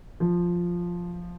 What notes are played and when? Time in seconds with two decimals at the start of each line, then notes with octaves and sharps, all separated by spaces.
0.20 F3